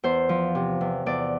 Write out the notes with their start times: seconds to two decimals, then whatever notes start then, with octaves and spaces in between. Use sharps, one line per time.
0.04 E2 C5
0.29 F3
0.55 C3
0.81 E2
1.06 E2 D5